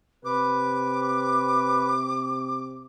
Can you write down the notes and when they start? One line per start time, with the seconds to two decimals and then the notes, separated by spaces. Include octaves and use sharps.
0.25 C3 B4 D6